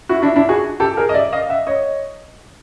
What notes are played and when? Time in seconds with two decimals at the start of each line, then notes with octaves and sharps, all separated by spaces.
0.09 E4 F#4
0.22 D4 E4
0.36 D4 E4
0.49 F#4 G#4
0.80 G4 A4
0.97 G#4 A#4
1.09 D#5
1.14 D5 E5
1.32 D#5 F5
1.49 E5 F#5
1.67 C#5 D#5